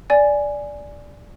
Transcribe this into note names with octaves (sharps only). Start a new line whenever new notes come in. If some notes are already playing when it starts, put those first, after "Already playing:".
D5 G#5